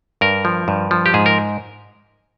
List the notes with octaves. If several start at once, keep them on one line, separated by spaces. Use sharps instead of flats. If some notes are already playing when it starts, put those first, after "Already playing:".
G2 A#4
F3
G2
F3
G4
G#2 G#4
A#4